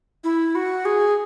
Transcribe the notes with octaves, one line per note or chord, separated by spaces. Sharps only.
E4
F#4
G#4